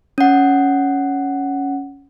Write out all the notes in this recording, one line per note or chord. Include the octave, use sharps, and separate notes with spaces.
C#4 F#5